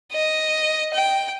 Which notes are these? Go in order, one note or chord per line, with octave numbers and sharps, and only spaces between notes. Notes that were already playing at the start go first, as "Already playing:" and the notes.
D#5
G5